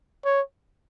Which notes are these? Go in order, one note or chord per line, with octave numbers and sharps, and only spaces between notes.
C#5